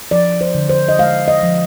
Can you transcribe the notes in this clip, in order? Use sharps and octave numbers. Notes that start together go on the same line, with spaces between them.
F3 D5
C5
D3
C5
D#5
G#3 F5
D#5
F3